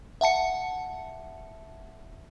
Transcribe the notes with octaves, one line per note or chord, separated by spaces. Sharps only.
E5 F#5 A5 C#7